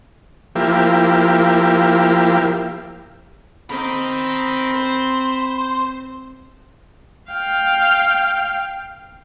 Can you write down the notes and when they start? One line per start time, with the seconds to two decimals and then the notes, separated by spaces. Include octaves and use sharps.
0.55 F3 A#3 E4 G4
3.70 C4 A#4 D#5 B5
4.76 C5
7.31 F5 G5